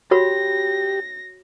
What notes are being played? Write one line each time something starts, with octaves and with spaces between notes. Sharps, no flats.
F#4 G4 C#5 B5 A#6